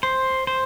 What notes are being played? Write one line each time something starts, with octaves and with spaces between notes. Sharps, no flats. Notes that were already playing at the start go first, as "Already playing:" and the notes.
C5
C5